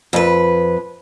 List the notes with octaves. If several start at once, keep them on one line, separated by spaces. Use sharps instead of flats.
F2 B4